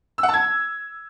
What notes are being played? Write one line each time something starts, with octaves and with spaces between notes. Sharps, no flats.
E6
F#5
A5
G#6